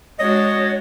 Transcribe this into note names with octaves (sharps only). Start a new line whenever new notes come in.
G#3 D4 F#4 C#5 D#5